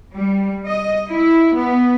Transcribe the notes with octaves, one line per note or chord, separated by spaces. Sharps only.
G3
D#5
E4
B3